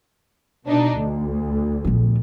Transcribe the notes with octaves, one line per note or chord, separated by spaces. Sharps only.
B2 D4 D#4
D2
A#1 B3